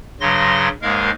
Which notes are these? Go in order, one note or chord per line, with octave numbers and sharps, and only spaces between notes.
G2 C#3 F#3 C6 A#6
D#2 G#2 G#3 A#4 F5